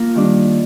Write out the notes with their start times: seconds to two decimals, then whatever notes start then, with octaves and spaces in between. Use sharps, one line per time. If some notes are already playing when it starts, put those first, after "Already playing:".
Already playing: A#3 F4 A#4
0.15 D#3 G3 D4